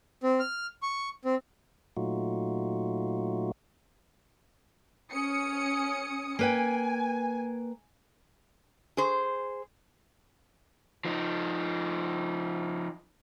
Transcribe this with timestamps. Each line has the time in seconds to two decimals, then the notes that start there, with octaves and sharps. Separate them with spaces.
0.24 C4
0.40 F6
0.82 C#6
1.25 C4
1.97 A#2 F#3 A3 D#4 F4 F#4
5.12 C#4 D#6 C#7
6.39 A#3 B4 G5 G#5
8.97 G#4 C5
11.05 F3 D#4